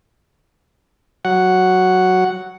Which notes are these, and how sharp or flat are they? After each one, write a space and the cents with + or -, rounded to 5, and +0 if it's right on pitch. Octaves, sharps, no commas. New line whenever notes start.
F#3 +0 F#5 +0